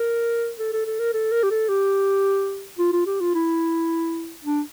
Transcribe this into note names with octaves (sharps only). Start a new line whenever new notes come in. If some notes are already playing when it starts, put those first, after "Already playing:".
Already playing: A#4
A4
A4
A4
A#4
A4
A#4
G4
A4
G4
F4
F4
G4
F4
E4
D4